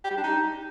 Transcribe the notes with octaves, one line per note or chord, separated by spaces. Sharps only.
G4
G3
D4
D#4